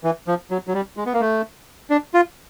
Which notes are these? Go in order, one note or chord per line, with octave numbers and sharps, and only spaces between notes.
E3
F3
F#3
F#3
G3
G#3
B3
A#3
A3
D4
F4